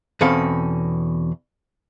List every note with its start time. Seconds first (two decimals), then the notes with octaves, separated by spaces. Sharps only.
0.21 E2 B2 C4 C#4 A4 F5